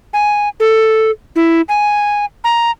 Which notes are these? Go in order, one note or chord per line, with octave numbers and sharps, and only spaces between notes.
G#5
A4
E4
G#5
A#5